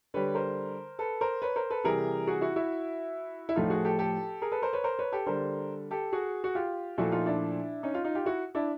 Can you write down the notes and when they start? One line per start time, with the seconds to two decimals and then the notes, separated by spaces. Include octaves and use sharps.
0.14 D3 G3 B4 C#5
0.35 A#4 C5
0.99 A4 B4
1.21 A#4 C5
1.42 B4 C#5
1.56 A#4 C5
1.70 A4 B4
1.84 C3 E3 G3 G#4 A#4
2.27 F#4 G#4
2.41 E4 F#4
2.56 E4 F#4
3.49 E4
3.55 A2 F3 A3 D#4 F4
3.70 F#4 G#4
3.85 G4 A4
3.99 G4 A4
4.42 G#4 A#4
4.52 A4 B4
4.62 A#4 C5
4.73 B4 C#5
4.84 A#4 C5
4.99 B4 C#5
5.12 G4 A4
5.26 D3 G3 A#4 C5
5.91 G4 A4
6.12 F#4 G#4
6.44 F#4
6.55 F4 G4
6.98 A#2 F3 A3 E4 F#4
7.12 D#4 F4
7.26 D4 E4
7.83 C#4 D#4
7.94 D#4 F4
8.04 D#4 F4
8.15 F4 G4
8.26 E4 F#4
8.55 D4 E4